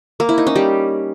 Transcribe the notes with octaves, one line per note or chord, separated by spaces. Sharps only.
A#3
E4
D#4
C#4
G3